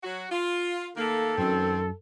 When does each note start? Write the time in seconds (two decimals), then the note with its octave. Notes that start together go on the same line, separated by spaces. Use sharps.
0.04 F#3 F#4
0.31 F4
0.96 D#3 A3 A#3 A4
1.38 F#2 D#3 C4